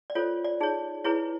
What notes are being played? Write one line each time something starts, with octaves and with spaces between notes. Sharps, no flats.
D5
F4 A4 C5 C#5
D5
D#4 G#4 C#5
E4 G#4 B4 C#5